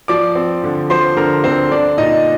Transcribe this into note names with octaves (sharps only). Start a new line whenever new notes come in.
F3 D5 D6
C4
D3
F3 C5 C6
D3 A#4 A#5
D3 C4 C5
D4 D5
A#2 D#4 D#5